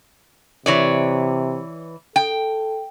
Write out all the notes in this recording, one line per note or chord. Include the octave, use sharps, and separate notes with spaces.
C3 E3 C#5 D5
A4 G5